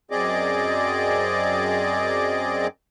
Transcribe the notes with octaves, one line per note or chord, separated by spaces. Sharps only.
F#2 C4 G#4 D5 D#5 D6